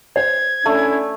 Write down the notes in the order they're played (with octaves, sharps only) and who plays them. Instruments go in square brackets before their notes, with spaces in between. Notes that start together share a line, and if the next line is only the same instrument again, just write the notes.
[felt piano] C5 [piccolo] G#6
[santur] A3 [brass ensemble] C#4 D4 E4